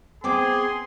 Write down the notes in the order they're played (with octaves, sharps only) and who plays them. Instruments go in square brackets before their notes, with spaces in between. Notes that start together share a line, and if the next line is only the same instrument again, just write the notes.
[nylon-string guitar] B3 C4 [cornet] G#4 [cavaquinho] G5 D6 [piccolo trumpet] C6